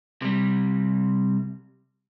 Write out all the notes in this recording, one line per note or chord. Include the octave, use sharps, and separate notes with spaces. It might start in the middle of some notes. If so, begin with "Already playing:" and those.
C3 G3